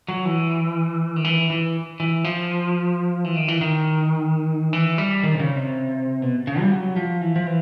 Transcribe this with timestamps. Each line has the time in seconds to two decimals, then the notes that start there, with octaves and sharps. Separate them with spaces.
0.08 F#3
0.25 E3
1.16 D#3
1.24 E3
1.50 E3
2.00 E3
2.24 F3
3.24 E3
3.36 D#3
3.48 E3
3.61 D#3
4.73 E3
4.98 G3
5.23 D#3
5.35 C3
5.40 C#3
5.55 C3
6.22 B2
6.47 C#3
6.60 G3
6.71 F#3
6.96 F3
7.21 E3
7.36 F3
7.47 E3